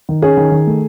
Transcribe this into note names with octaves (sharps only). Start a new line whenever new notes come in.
D#3
C#4 G#4
D#3
D#3
A3